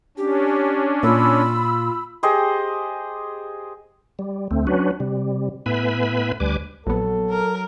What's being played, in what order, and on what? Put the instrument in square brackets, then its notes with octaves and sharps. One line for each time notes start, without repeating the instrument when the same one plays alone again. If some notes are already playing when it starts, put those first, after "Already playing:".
[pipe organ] C#4 D4 [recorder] G4
[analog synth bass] A#2 [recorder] F4 [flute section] B5 E6
[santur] G4 G#4 C5 D#5
[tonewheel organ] G3
D2 A3 C4
F#3 C#4 D4 F#4 B4
C3 G3
A2 B3 B4 E5 G#5 B5
D2 G3 B4 G#5 D6
[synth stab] A#1 B3 [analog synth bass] F#3 [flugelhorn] A4
[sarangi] A#4